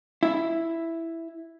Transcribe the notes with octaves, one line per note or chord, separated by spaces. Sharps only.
E4